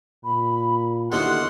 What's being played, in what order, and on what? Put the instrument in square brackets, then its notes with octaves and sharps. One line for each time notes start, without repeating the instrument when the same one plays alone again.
[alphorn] A#2 [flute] B5
[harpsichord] D#2 D3 B3 [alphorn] E4 [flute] F#4 [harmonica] F#5 C6